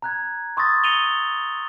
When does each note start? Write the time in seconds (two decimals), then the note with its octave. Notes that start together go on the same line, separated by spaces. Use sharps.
0.02 A#5 F#6 G#6
0.57 C6 C#6 D#6 E6 A6 A#6
0.84 A#6 C#7 D#7 F7 G7